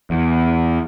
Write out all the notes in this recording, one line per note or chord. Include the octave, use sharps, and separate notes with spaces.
E2